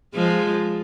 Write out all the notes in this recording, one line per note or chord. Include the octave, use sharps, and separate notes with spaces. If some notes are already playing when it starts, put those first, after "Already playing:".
F3 G#3